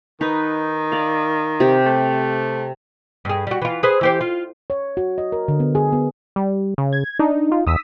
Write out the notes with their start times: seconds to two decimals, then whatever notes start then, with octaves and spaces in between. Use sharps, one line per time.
0.21 D#3 D#4 B4
0.92 D5 F5
1.60 C3 G4
1.86 A3
3.25 G2 G#4
3.47 G3 F#4
3.62 E3 F4
3.83 G#4 B4 C5
4.01 E3 G4 C5
4.21 F4
4.70 C#5
4.97 F#4
5.18 D#5
5.32 A#4
5.48 D3
5.60 B3
5.75 G#4
5.93 B3
6.36 G3
6.78 C#3
6.93 G#6
7.19 D4 D#4
7.52 F4
7.67 E2 D#6 E6 B6